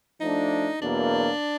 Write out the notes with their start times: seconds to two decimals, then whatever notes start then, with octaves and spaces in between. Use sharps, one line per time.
0.21 F3 A3 D4 D#4
0.81 E2 B2 F#3 A#3 D4